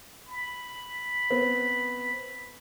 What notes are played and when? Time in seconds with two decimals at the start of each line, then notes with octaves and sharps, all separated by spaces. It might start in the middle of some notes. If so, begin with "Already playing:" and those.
0.28 B5
1.30 B3 C4